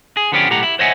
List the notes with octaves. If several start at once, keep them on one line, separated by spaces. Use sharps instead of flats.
G#4
D3 F3 B3 C#4 D4 G4
B1 A2 G4 F#5 A#5
E4
C5 C#5 D#5 E5 F#5 G#5